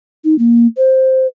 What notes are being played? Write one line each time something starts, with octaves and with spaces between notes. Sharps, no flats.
D#4
A#3
C5